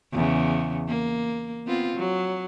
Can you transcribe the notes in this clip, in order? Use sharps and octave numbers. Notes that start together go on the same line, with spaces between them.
E2 C#3
A#3
B3 C4 F4
F#3